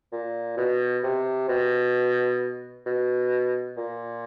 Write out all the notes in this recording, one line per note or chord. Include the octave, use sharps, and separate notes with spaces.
A#2
B2
C3
B2
B2
A#2